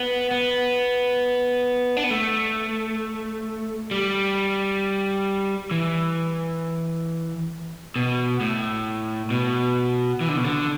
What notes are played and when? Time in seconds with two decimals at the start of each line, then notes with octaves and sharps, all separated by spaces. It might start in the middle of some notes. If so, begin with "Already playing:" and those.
Already playing: B3
0.31 B3
1.97 D4
2.04 B3
2.11 A3
3.91 G3
5.71 E3
7.96 B2
8.41 A2
9.30 B2
10.21 E3
10.29 D3
10.37 B2
10.45 D3